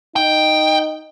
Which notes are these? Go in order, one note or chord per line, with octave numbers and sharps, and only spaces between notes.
D#4 G5